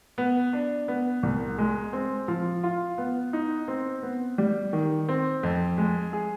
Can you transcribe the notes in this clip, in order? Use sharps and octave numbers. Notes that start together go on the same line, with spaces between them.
B3
D4
B3
C2
G#3
C4
F3
F4
B3
D#4
C4
B3
G3
D#3
C4
F2
G#3
G#4